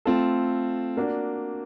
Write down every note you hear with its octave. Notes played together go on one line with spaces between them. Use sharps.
A3 C4 F4 A4
A#3 D4 F#4